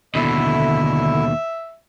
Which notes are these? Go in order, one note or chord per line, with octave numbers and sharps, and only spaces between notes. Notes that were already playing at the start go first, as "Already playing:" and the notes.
D#2 B2 D3 E4 E5